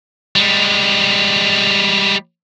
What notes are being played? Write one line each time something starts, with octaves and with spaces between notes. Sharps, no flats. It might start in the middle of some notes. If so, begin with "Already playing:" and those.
G3 G#3